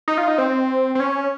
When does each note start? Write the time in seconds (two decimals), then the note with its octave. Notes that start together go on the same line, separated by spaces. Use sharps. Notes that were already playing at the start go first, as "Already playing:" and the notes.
0.08 D#4
0.18 F4
0.28 D#4
0.38 C4
0.95 C4
1.00 C#4